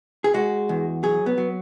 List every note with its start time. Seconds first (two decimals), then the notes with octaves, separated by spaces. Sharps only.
0.24 G#4
0.34 G#3 F#4
0.69 E2
1.03 F#3 G#4
1.26 B3
1.38 F#3